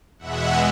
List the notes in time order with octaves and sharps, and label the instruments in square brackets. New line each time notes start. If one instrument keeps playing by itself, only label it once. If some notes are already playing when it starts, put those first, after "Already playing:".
[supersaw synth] E2 B2 G#3 E5 F#5